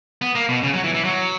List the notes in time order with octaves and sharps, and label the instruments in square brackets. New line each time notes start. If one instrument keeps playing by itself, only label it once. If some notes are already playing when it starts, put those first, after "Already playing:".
[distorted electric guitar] B3
A#3
B2
C#3
F#3
E3
E3
F#3